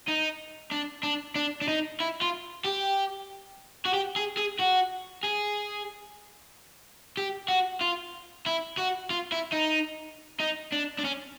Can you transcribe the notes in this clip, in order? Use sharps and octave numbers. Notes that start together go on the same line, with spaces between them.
D#4
D4
D4
D4
D4
D#4
E4
F4
G4
F#4
G4
G#4
G#4
F#4
G#4
G4
F#4
F4
E4
F#4
F4
E4
D#4
D#4
D4
D4
C#4